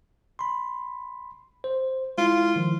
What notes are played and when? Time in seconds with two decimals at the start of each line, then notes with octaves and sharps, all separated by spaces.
0.39 B5 C6
1.64 C5
2.18 G#3 E4 F4
2.56 D#3 F3